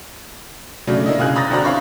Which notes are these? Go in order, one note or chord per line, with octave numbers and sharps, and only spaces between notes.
C#3 F#3 A3 D4
A#3 D4 E4 D#5
C#3 F4 G#4 G#5 F#6
A#5 B5 D#6 G6 A6 A#6
D3 C4 D4 F#4 A#5 F#6
E4 C#5 F5 B5 C#6